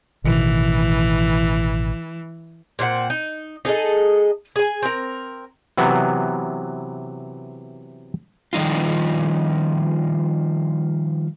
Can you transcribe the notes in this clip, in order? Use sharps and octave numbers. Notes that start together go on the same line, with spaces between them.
A1 B2 D#3 E3
A#2 C4 D4 F#5
D#4
D#4 G#4 A4 D#5
G#4 G#5
C4 A#4
C3 E3 F#3 B3
D#3 F3 G3 D#4 F4